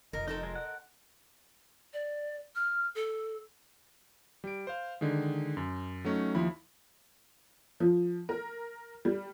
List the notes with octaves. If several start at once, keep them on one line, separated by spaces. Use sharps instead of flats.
F1 A#4 D#5
C4 D#4 A4 A#4
G#3
F#5
D5
F6
A4
G3 D7
C5 F5
D3 D#3 G#3
F#2
F#3 A3 C#4 D#4
D#2 F3 E4 B5
F3
A#4
G3